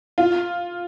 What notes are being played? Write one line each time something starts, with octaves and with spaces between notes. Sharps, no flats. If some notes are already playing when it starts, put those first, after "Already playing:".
F4